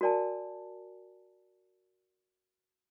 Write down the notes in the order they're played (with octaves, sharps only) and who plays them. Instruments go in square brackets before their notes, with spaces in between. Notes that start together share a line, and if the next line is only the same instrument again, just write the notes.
[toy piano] F#4 A#4 D5 G#5 A5